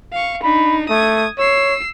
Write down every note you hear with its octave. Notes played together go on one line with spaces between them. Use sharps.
F5 C#6
D4 D#4 B5
A3 D#6 G#6
C#5 E6 C7